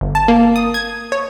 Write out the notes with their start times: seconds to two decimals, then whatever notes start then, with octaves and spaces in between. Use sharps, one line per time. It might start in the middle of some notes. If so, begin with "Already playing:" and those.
0.01 G1
0.15 A5
0.28 A#3
0.56 D#6
0.74 G#6
1.12 C#5